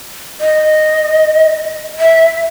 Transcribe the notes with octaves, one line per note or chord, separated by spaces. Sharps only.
D#5
E5